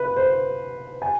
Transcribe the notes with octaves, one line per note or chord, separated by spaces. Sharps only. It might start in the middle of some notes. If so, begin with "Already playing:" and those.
Already playing: B4
C5
G#5